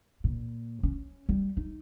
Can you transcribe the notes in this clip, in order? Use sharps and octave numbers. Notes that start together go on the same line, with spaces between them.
A#2
C#4
G3
D#4